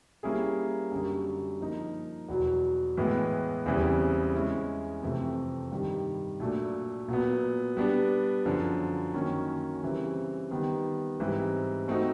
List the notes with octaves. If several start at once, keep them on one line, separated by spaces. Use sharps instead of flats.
G3 A#3 C#4 E4 G#4
F#2 D3 G3
F3 A#3 D#4
E2 B2 F#3
A2 E3 G#3 B3
E2 C#3 E3 G3 C4
G#3 C#4 E4
F2 C3 E3 A3 C4
G2 D#3 G3
A#2 F#3 A3 D4
A#2 F#3 B3
G3 B3 D4
F#2 D3 F3
F#2 D#3 F#3 A#3 C#4
C#3 E3 G3 C4 E4
D#3 G3 B3
G#2 E3 G3 C4
A3 C4 D#4 F#4